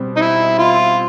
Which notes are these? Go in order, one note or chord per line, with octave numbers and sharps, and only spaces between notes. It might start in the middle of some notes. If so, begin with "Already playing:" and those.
Already playing: B2 G3 C4
D#4
E4
F4